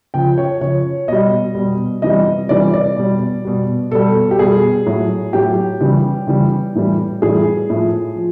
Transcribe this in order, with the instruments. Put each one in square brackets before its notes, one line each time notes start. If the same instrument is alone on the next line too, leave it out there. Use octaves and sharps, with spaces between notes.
[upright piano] C#3 F3 G5
C#5
C#3 F3 C#5
B2 G3 D#5
B2 G3
C3 E3 G3 D#5
C3 E3 G3 D5
D5
B2 G3
B2 G3
B2 G3 A4
G4
B2 G3 G#4
A2 F#3
A2 F#3 G4
C#3 E3 G3
C#3 E3 G3
A2 E3 G3
A2 E3 G3 G#4
A2 F3
F3